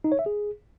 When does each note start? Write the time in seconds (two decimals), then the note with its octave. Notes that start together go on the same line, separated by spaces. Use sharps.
0.04 D#4
0.12 C#5
0.19 E5
0.26 G#4